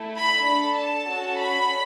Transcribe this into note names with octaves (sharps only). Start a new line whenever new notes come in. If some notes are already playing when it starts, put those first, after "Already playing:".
Already playing: A3 E4 A4
B5
D4 A4 B5
A5
C#4 F#4 A4
B5